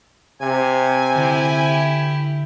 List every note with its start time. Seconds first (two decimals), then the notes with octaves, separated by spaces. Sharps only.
0.41 C3 G#5
1.15 D3 E4 G4